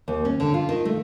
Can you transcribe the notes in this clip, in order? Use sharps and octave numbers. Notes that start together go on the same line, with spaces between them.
D#2
C#4
D3
F4
D#3
A3